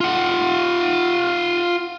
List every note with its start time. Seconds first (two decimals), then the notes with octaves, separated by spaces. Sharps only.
0.01 F4 F#5